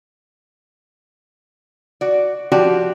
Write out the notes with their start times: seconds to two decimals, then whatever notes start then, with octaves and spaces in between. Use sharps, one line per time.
2.01 F#4 D5
2.52 F3 F#4 G4 D5